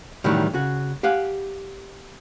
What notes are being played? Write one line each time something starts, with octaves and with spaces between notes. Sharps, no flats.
A2 D#3 E3 F#3 G3
C#3 F#4
G4 F5 F#5 G#5